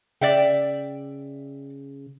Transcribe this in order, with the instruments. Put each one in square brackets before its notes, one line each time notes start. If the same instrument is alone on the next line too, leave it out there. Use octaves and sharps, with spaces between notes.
[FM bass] C#3 [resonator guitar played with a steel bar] D5 E5 G5